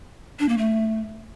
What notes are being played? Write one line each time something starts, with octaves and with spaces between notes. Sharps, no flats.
D4
A#3
A3